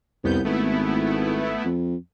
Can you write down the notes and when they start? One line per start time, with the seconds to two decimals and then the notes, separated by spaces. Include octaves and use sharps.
0.24 C2 F2 B3 G6
0.45 G#1 A3 B3 E4
1.65 F2